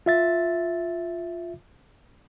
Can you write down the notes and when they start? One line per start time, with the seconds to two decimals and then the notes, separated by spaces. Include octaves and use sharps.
0.06 F4 E5 A6